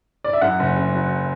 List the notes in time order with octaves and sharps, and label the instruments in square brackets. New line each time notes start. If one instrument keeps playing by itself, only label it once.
[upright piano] D5
E5
F#2 F#5
F#1
C#3
F#3